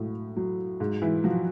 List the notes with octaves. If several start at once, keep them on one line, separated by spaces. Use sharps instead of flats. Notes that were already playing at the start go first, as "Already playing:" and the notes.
Already playing: A2 F#3
F#3
G#2
E3 E4
F3 F#3 F#4